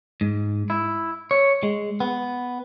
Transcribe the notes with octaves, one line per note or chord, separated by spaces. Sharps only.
G#2
E4
C#5
G#3
B3